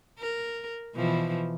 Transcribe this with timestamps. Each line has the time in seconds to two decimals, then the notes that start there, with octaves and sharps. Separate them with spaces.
0.19 A#4
0.95 B2 E3 F3